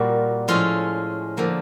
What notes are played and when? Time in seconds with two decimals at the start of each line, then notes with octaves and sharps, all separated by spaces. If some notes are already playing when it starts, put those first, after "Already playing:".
Already playing: A#2 G3 A#3 F#4
0.48 A2 F3 G#3 C#4 F4
1.37 D3 F3 A#3